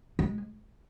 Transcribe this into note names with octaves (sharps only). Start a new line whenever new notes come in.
G#3